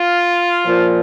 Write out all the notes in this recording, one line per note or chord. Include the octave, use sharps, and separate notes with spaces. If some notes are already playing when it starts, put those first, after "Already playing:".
Already playing: F4
A#2 F3